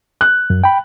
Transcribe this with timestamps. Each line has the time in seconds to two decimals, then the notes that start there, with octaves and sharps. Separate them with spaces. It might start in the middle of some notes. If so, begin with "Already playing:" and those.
0.21 F#6
0.50 F#2
0.64 G5 B5